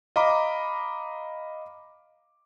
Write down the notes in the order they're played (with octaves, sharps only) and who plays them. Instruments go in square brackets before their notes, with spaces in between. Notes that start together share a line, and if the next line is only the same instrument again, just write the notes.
[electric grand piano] D#5 F5 A#5 B5 D6